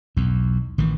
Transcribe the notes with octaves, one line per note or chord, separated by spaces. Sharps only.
B1 E2
A1 D#3 E3